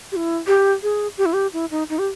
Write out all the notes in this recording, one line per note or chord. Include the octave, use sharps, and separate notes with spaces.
G4
E4
G4
G#4
G4
E4
G4
E4
D#4
D#4
G4